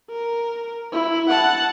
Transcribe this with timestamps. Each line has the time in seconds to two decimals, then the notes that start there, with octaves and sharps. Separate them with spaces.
0.10 A#4
0.92 E4
1.30 F#5 A5